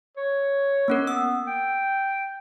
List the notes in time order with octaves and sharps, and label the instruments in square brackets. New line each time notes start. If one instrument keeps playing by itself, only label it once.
[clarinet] C#5
[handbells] A#3 C#4 A#4
[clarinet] B3 [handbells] E6
[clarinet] G5